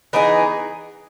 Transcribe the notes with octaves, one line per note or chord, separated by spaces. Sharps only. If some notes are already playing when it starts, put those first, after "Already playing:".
E3 B3 D#4 G#4